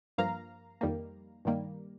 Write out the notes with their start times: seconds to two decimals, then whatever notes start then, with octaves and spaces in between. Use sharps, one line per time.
0.18 G2 F3 A#3 F5 A#5
0.81 F2 D#3 G3 A#3
1.45 G2 D#3 G3 A#3